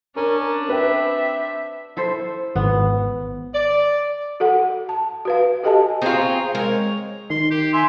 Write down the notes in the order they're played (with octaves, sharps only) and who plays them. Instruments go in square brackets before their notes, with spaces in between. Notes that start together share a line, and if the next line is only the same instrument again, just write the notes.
[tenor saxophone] C#4 [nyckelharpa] D4 [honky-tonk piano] A#4
[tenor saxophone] C4 [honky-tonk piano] B4 G5 [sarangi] E5
[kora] E4 A4 C5
[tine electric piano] G#1 [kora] B3
[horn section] D5
[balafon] F#4 A4 F#5
A5
F#4 B4 F5
F#4 G4 A4 D#5 G#5 A5
[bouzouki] C4 F4 [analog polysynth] G#4 A#5 C#6
[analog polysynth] G#3 C4 C#5 [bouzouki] A#4
[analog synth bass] D#3 [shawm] C6
[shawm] G4
[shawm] E5 [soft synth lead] G#5 [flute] C6